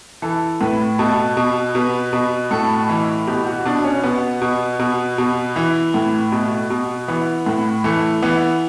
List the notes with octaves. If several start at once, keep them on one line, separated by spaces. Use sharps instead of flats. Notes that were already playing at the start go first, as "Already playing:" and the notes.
E3 A4
A2 B4
B2 A4
B2
B2 B4
B2
A2 A4
E3
B2 G4
F#4
B2 D4
C#4
B2 B3
B2
B2
B2
E3
A2
B2
B2
E3 B3
A2
E3 A3
E3 B3